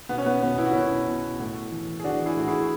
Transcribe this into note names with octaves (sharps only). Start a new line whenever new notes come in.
B2 B3
C#4
B3
B2 B3
E4
F#4
B2 C#4 E4
B2
A2
E3
G#4
E3 D4 F#4
E4 G#4
A2 F#4
E4 G#4